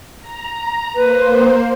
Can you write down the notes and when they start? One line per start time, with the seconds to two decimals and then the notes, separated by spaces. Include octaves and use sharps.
0.20 A#5
0.95 A#3 B4 C5